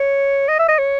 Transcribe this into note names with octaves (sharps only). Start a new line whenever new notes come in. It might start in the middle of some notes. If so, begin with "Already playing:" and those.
Already playing: C#5
D#5
E5
D#5
C#5